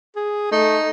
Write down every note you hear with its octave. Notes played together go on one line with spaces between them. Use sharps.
G#4
A3 D#4